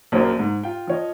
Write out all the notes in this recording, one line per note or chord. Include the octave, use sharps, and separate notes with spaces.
A#1 F#2 D4 A#4 C5 C#5
G#2
F4 G5
F3 C#5 D#5